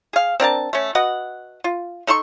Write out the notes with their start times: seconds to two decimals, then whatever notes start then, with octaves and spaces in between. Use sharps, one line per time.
0.13 G#4 F5
0.40 C4 D4 A#4 A5
0.73 A3 C#4
0.95 F#4 B4 D#5 F#5
1.64 F4
2.07 D#4 A4 C6 C#6